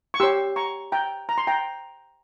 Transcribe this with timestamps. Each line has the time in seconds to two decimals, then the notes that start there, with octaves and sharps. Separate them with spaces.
0.14 C#6
0.20 G4 C#5 C6 E6
0.56 A#5 C#6
0.92 G5 A#5
1.29 A#5
1.38 C6
1.47 G5 A#5